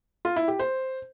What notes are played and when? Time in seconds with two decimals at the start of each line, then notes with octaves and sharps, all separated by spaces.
0.25 F4
0.36 E4
0.48 G4
0.59 C5